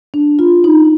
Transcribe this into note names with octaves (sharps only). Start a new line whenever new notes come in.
D4
F4
D#4